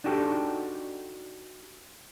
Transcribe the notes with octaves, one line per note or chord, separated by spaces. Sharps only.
D4 D#4 F#4 G4 A4